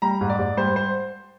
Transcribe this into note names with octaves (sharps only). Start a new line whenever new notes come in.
G3 A#5
G#2
D5
G#2
G3 C5
C5